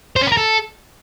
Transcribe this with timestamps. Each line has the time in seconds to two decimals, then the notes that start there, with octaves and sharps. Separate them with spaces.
0.16 C5
0.21 C#4
0.27 B4
0.32 A#4
0.37 A4